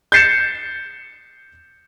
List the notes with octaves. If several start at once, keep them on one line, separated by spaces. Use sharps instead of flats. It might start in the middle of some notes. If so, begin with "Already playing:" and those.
G6 A6 C7 C#7 E7